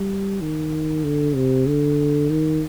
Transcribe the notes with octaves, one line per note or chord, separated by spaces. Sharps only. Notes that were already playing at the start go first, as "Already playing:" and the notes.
Already playing: G3
D#3
D3
C3
D3
D#3